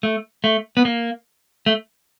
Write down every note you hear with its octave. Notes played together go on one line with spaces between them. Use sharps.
A3
A3
B3
A#3
A3